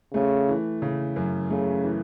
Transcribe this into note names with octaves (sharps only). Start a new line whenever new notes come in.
C#3 A3
E3
C#3
F#2
C#3 A3
E3